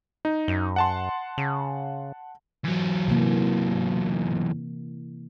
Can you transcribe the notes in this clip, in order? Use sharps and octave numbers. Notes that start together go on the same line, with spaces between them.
D#4
F#2
F#5 A5 C6
C#3
E2 F#3
C3 E3 A#3